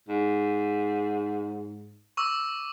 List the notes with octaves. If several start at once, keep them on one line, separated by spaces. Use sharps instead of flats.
G#2
C#6 D6 E6